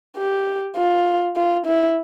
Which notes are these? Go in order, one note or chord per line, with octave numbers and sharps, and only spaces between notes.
G4
F4
F4
E4